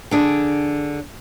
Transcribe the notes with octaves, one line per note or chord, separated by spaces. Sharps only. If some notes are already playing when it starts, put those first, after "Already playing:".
D3 D4 G#4